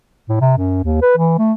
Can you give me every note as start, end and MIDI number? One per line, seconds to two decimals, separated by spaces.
0.29 0.37 45
0.41 0.53 48
0.58 0.82 42
0.83 0.99 39
1.02 1.16 71
1.18 1.35 52
1.39 1.53 57